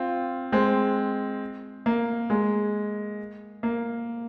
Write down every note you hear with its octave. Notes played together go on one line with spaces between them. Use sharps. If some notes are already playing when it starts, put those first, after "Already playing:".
Already playing: C4 F4
G#3 C4
A#3
G#3
A#3